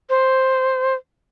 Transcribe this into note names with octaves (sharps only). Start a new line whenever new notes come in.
C5